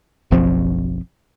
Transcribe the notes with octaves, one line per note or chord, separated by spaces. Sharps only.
F#1 B1 F3 C4